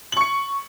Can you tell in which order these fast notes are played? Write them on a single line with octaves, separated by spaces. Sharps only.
F#7 C#6 C#7